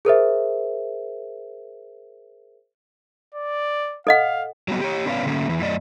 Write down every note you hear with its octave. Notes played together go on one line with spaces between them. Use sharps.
G#4 A#4 C5 E5
D5
A4 D#5 F5 F#5
F#3 G3 B3 F#4
G4 C#5
B3 C#4 B4 C#5 D5 F5
D3 A3 A#3 C#4
E2 E3
F#2 A3 D5 D#5